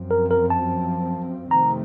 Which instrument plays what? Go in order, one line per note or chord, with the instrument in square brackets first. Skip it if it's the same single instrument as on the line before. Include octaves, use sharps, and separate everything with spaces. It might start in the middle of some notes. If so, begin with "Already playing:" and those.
Already playing: [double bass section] F#2 F3 C4
[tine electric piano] A#4
A#4
A5
[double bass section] F2 C3 D#3 A3 C4 [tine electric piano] A#5